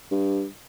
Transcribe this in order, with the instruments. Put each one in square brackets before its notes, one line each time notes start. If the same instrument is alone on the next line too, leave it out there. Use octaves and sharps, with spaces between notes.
[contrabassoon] G2